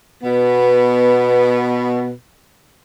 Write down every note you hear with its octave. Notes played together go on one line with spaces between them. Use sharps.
B2 B3